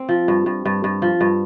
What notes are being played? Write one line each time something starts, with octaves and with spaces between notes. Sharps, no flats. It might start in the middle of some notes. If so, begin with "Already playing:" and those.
Already playing: C4
F3
G2
G2
G2
G2
F3
G2